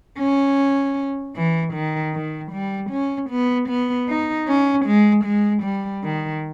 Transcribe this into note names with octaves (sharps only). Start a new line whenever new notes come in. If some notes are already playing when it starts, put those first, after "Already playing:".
C#4
E3
D#3
D#3
G3
C#4
B3
B3
D#4
C#4
G#3
G#3
G3
D#3